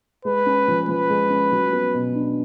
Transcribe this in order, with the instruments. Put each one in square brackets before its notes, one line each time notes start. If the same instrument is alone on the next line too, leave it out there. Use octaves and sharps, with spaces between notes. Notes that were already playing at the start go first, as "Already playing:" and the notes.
[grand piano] G#3 [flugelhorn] B4
[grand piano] C#4
F3
[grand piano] F3 [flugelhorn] B4
[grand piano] G#3
C#4
F#3
B3
B2
D4